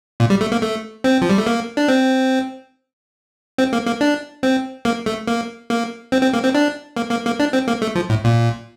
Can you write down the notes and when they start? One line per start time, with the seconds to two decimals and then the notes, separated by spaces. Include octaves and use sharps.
0.20 A#2
0.30 G3
0.41 A3
0.52 A#3
0.62 A3
1.04 C4
1.22 F3
1.30 G3
1.38 A3
1.46 A#3
1.77 D4
1.88 C4
3.58 C4
3.73 A#3
3.86 A#3
4.01 D4
4.43 C4
4.85 A#3
5.06 A3
5.27 A#3
5.70 A#3
6.12 C4
6.23 C4
6.33 A#3
6.44 C4
6.55 D4
6.97 A#3
7.11 A#3
7.26 A#3
7.39 D4
7.53 C4
7.68 A#3
7.82 A3
7.95 F3
8.09 A2
8.24 A#2